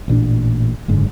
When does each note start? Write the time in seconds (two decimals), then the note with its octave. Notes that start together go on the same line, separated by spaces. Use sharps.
0.08 A1 A#2 C#4 D4
0.88 F#1 G#2 D3 G#3